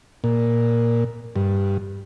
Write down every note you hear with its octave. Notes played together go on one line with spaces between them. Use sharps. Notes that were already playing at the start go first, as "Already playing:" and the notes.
A#2
G2